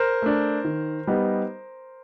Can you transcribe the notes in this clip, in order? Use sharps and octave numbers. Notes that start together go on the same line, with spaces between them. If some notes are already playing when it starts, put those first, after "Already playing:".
Already playing: A#4 C5
A3 D4
D#3
G3 B3 D#4